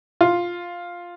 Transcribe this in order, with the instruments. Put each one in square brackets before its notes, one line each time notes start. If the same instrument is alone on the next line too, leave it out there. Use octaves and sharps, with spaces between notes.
[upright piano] F4